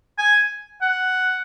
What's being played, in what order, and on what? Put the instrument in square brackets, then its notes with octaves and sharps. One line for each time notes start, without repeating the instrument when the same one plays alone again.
[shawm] G#5
F#5